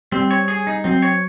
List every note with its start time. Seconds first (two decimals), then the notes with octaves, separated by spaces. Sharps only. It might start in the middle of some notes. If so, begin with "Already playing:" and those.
0.12 G3 C4
0.31 C#5
0.48 G#4
0.67 D#4
0.84 F#3 C4
1.02 C#5